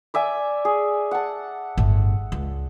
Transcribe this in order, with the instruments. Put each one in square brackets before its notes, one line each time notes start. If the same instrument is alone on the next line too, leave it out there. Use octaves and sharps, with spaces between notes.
[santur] D5 E5 G#5
G#4
F#5 A5
[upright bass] G1 A2
C#2